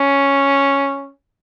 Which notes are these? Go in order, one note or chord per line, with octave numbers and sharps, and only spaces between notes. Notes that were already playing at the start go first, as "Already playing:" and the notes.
Already playing: C#4